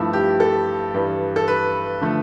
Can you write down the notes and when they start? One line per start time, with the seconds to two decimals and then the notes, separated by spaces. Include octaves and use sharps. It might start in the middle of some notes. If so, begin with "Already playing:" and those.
Already playing: G2 F3 A3 E4
0.13 G4
0.40 A4
0.94 G2 E3 G3
1.36 A4
1.48 B4
2.01 D3 F3 A3